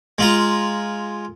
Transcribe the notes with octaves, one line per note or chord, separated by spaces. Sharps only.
G#3 F4 A#5